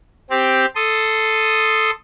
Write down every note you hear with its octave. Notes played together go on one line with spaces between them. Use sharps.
C4 G4
A4 C6 D#6